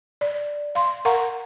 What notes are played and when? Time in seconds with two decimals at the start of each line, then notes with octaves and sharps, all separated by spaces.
0.21 D5
0.75 F5 C6
1.05 A#4 F5 F#5 A#5 C#6